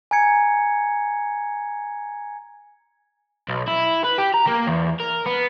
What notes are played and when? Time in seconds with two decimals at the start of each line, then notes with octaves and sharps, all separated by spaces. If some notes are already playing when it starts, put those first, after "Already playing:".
0.11 G#5 A#5 G#6 C#7
3.49 B1
3.68 E4
4.04 B4
4.18 G4
4.34 A#5
4.47 A#3
4.67 E2
5.00 A#4
5.26 B3